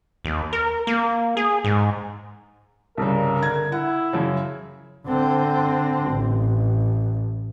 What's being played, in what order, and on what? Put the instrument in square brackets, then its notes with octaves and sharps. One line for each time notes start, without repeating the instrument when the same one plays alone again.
[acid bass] D#2
A#4
A#3
G#4
G#2
[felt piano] C2 G2 C#3 [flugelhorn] A#4
[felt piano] D3 G#6
[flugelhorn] E4 [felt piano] F#5
[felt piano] F#2 C#3
[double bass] D3 C4
A1